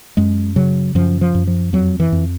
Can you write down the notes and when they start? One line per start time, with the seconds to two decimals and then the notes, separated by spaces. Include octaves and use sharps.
0.17 F#2 G#3
0.56 C#3 F#3
0.95 F#2 F3
1.21 F3
1.35 F#2
1.47 F3
1.73 F2 F#3
2.00 E3
2.12 F2